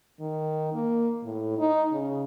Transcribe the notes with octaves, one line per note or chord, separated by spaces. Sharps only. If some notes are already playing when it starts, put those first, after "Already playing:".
D#3
A#3
A2
D#4
C#3